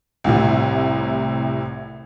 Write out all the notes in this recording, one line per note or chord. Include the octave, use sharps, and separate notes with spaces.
C2 A2 C3